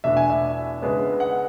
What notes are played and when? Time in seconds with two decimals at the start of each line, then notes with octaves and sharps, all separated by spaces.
0.04 E2 B2 A3 D4 E5
0.17 G#5
0.30 E5
0.82 C#2 C#3 G#3 B3 D4
1.20 F#5